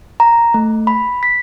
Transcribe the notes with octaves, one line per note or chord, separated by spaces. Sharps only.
A#5
A3
B5
B6